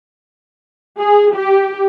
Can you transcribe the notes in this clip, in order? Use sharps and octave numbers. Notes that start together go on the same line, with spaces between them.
G#4
G4